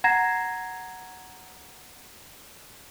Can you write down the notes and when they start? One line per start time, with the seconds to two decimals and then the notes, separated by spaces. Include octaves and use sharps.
0.04 F#5 A#5 G#6 A#6 C7 E7